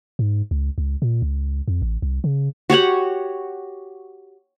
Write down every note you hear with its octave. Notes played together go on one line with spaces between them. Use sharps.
G#2
C#2
C#2
A#2
C#2
F2
A1
C2
C#3
F#4 G4 C#5 F#5